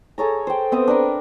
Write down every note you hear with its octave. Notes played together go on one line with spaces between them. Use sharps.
G#4 A4 C#5 A#5
C5 G5
B3 C4 E5 D#6
D4 A#4 B4